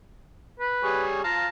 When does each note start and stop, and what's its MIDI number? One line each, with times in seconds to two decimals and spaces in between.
0.60 1.03 71
0.84 1.24 55
0.84 1.24 68
0.84 1.24 73
1.24 1.47 65
1.24 1.47 77
1.24 1.47 81
1.24 1.47 82